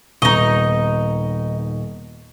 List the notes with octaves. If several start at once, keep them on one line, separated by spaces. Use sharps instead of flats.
D#1 B3 D#4 D#5 C#6